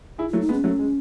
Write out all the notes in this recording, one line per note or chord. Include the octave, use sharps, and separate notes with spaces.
E4 G#4
F#3 A3 E4
D#4
G#3 B3
C#4
F#3 A3
G#3